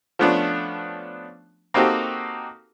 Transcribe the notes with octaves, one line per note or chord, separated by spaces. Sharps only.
F3 A3 B3 C#4 D4 F4
A#3 C4 D#4 F#4 G4 A4